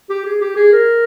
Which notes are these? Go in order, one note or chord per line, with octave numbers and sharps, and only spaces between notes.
G4
G#4
G4
G#4
A#4